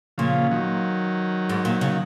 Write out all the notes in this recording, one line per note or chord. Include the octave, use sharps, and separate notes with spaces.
A#2 C#3 F3
D#3 F#3
G#2
A#2
C#3